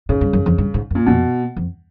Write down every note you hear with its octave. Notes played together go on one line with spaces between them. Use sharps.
G#2 C#3
G2
F#2
F2
G2
G#2
F#2
A#2
F2 B2
F2